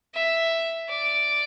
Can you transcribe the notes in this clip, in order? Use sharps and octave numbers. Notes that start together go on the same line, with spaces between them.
E5
D5